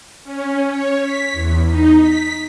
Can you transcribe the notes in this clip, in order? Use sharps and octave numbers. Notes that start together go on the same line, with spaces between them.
C#4
C#5
B6
E2
D#4
B6